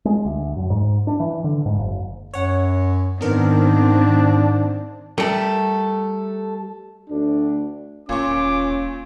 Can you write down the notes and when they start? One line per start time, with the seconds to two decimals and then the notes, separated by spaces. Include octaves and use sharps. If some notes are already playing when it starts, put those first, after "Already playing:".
0.05 G#3
0.25 D2
0.57 F#2
0.70 G#2
1.07 D4
1.20 E3
1.44 D3
1.66 G#2
1.78 F#1
2.34 F#2 C#5 F#5
3.21 G#2 D#3 B3 C4 D4 A#4
5.18 G3 A3 G4 A4 A#4
7.10 D2 D4
8.09 E1 A#2 C#4 C#6 D6